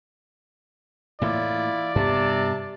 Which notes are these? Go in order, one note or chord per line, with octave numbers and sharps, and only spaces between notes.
A2 E3 A#3 E4 F4 D5
G2 C3 B3 A5